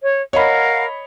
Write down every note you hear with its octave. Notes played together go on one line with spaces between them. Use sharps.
C#5
A#4 C#5 D#5 F5 F#5 B5